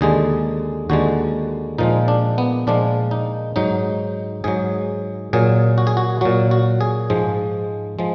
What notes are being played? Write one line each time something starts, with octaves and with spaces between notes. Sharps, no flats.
D#2 D3 G#3 G#4
D#2 D3 G#3 F#4
A#2 F3 G#3 D#4
D4
B3
A#2 F3 G#3 D4
D#4
G#2 F#3 D#4
G#2 F#3 G#4
A#2 F#3 G#4
F#4
G#4
F#4
A#2 F#3 F#4
F#4
G#4
G#2 F3 G#3
F3 G#3